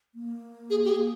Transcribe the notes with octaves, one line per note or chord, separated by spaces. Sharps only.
A#3
G#4
G4
G#4